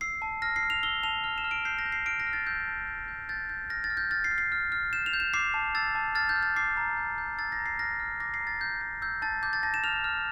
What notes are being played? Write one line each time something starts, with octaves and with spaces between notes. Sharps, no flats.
E6 C7
A5
F6 A#6
C7
F6
F7
E6 G7
A5 F7
F6
E7
F6
D7
G6 C7
A#6
G6
C7
F6 D7
A#6
F6
A6
E6 G6
A5
G6
G6
G6 A6
G6
F6 A#6
A6
F6
G6
F6 A6
C7
F6
C7
F6
F6
G6 E7
F7
G6
E7
D6 C7
A5
E6 A6
A5
F6 A6
G6
F6
A6
D6 C7
A#5
G6
G6
E6 A6
A#6
A#5
C7
F6 A#6
F6
D6 A#6
C7
A#5
A6
G6
G6
E6 G6
A5 A6
D6 G6
A6
A5 A#6
E7
F6 F7
F6